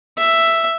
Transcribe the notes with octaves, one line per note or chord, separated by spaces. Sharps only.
E5